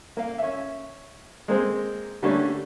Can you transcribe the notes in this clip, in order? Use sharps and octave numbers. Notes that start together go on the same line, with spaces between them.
A#3 F5
C#4 E5
G#3 A#3 C4
D3 G3 A3 A#3 C#4 D4